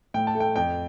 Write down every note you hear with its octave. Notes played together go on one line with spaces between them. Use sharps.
A2 G5
A5
A3
G5
F2 G5